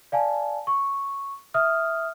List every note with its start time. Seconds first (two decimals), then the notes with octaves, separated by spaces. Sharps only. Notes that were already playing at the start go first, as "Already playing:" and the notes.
0.12 D5 F5 G#5 A5
0.67 C#6
1.54 E5 D#6 F6